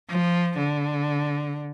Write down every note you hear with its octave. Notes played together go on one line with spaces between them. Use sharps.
F3
D3